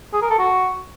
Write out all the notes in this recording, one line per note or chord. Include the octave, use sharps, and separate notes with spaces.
G#4
A#4
A4
F#4